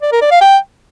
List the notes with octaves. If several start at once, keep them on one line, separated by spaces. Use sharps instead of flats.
D5
A#4
D5
F5
G5